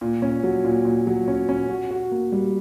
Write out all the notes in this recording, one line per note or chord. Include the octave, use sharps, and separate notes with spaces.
A#2
C#4
F#3
A#2
A#2
F#3
C#4
C#4
F#4
F#4
A#3
G3